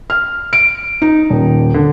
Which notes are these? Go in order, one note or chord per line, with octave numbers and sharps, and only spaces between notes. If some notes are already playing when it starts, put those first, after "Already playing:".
F6
D7
D#4
D#1
D3